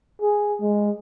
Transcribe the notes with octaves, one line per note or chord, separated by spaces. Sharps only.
G#4
G#3